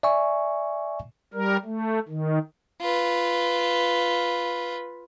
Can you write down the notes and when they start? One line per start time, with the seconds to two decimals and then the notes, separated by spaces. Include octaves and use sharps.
0.03 D5 E5 G#5 C#6
1.34 G3 A#4
1.65 A3
2.08 D#3
2.81 F4 B4